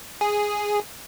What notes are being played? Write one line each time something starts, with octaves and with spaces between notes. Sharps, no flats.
G#4